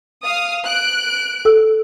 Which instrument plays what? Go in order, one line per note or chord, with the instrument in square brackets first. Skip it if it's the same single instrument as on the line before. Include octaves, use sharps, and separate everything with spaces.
[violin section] F5 D#6
F#6 D7
[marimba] A4 E6